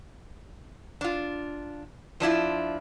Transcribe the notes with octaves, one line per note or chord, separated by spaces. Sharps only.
D4 F4
F3 D4 E4 F4